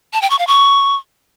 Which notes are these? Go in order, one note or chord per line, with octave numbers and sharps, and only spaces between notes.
A5
G5
C#6
F5
C#6